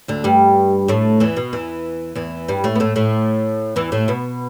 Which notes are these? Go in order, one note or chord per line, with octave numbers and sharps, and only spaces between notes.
D2 D3
G2 G3
A2 A3
E2 E3
B2
E2 E3
E2 E3
G2 G3
A2 A3
B3
A2 A3
A2 A3
E2 E3
A2 A3
B2 B3